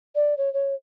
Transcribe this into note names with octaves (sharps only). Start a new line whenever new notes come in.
D5
C#5
C#5